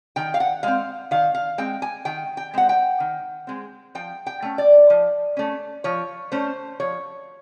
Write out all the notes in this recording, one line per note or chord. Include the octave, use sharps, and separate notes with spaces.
D#3 G5
F5
F#5
G#3 C4 F5
D#3 F5
F5
G#3 C4 G5
G#5
D#3 G5
G5
G#3 C4 F#5
G5
D#3
G#3 C4
F3 G5
G5
A3 C#4
D5
F3
A3 C#4
F3 C#5
A3 C#4 C5
F3 C#5